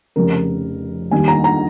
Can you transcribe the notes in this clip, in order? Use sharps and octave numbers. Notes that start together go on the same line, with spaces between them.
F1 F2 C#3 A#4
D#2 D#3 G3 G#5
A#5
A#5